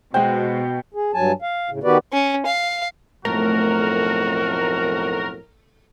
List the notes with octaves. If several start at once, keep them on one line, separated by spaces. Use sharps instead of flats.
B2 G#3 F#4 C5 G5
G#4
G2 F#3 G#5 A5
F5
A2 C#3
D#3 B3 F#4 G4 B4 D5
C#4
F5
B1 F2 A2 A3 F#4 A#4